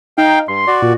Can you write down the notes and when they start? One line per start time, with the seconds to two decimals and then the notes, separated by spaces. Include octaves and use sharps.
0.18 D#4 F5 G5
0.48 G2 C6
0.67 F#4 D5
0.82 A#2